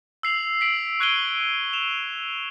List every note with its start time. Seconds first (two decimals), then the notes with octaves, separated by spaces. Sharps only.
0.23 E6 C7 F7 F#7
0.61 B6 D7 F#7
1.00 C#6 F#6 G#6 D7 D#7 G7
1.73 E7 F7